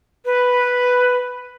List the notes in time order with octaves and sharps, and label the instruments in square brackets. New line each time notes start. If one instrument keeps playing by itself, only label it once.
[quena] B4